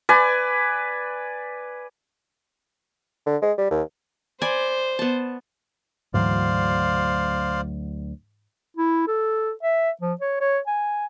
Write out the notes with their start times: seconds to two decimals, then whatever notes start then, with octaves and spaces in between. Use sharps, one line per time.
0.09 B4 D5 G#5
3.26 D3
3.42 G#3
3.58 G3
3.71 D#2
4.41 C5 D5 G#5 B5
4.99 B3 A5
6.14 D2 G#2 E3 F#3 C5 D5 F5
8.77 E4
9.07 A4
9.63 E5
10.02 F3
10.21 C#5
10.41 C#5
10.67 G#5